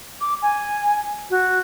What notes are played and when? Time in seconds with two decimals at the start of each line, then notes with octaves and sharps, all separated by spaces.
0.21 D6
0.42 G#5
1.30 F#4